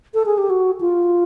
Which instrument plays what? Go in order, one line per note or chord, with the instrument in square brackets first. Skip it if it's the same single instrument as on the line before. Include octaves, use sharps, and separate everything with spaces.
[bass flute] A4
G#4
G4
F#4
F4